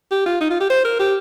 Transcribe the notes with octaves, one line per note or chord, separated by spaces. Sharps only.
G4
F4
D#4
F4
G4
C5
A#4
G4